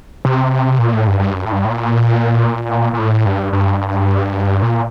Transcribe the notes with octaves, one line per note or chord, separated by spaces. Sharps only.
C3
A#2
A2
G2
G2
F#2
A2
G2
A2
A#2
A#2
A2
G2
G2
A#2